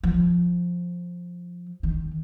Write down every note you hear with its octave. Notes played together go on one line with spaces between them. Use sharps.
F3
D#3